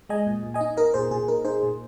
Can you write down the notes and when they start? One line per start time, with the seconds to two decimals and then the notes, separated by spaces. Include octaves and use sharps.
0.09 G#3 D#5 G#5
0.27 A#2
0.43 A#2
0.54 D#5 G#5
0.61 D#4
0.77 D#4 A#4 D#5
0.94 A#2 G#4 C5
1.11 A#2 G#4
1.28 D#4 A#4
1.45 D#4 G#4 C5
1.63 A#2